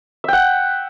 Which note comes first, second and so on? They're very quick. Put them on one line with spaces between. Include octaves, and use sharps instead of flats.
E5 G5 F#5